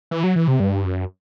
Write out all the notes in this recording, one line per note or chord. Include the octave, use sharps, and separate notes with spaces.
E3
F#3
E3
C3
G2
F#2